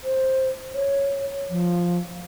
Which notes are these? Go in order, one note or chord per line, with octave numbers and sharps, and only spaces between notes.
C5
C#5
F3